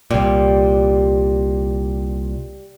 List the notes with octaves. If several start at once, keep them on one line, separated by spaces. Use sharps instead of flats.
C2 A#2 G3